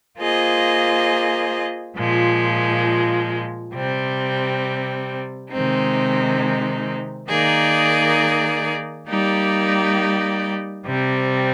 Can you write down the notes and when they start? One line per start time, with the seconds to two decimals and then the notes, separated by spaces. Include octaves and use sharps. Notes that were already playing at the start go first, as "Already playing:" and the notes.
0.19 A#3 F4 G#4 C5 D#5
1.96 A#2 F3 G#3
3.74 C3 G3 C4
5.52 C3 D#3 G#3 C4 D#4
7.29 D#3 A#3 D#4 G#4 D5
9.08 G3 A#3 D#4 G4 D5
10.86 C3 G3 C4